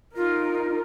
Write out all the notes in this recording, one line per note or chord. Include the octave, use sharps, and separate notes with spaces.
D#4 F4 A#4